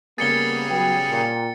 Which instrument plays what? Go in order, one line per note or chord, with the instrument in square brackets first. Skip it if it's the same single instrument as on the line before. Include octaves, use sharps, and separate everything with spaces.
[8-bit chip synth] C#3 G3 G#4 [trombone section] A#3 B3 [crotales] A6 C#7 G7
[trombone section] F#3 B3 [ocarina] G5
[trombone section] A#2 [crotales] C#7